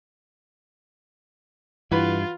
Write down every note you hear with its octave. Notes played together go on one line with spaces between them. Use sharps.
G2 E3 F#3 F4 B4